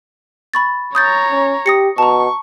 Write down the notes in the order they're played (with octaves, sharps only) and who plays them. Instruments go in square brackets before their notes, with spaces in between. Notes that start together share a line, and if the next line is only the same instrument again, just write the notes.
[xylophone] B5 C#6 A6
[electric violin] C#5 A#5 [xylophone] D#6 G6 A6
[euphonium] C#4
[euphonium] G4 [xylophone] D#6 A#6 C#7
[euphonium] B2 [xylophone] A5 A#5 [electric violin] C#6